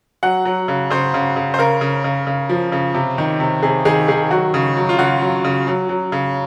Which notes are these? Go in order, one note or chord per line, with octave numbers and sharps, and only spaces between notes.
F#3 F#5
F#3
C#3
C#3 C5
C#3
C#3
C5
C#3 A#4
C#3
C#3
C#3
F3
C#3
C3
D#3
C3
C3 G#4
D#3 G#4
D#3 G#4
F#3 F#4
C#3
F#3
F4
C#3 F#4
F#3
C#3
F#3
F#3
C#3